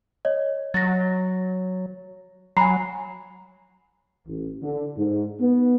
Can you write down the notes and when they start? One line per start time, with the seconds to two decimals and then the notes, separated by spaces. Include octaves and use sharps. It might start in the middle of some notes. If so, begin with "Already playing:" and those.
0.25 C#5 D#5
0.74 F#3 A6 A#6
2.57 F#3 G#5 A#5 B5 C7
4.27 A1
4.62 D3
4.97 G#2
5.41 B3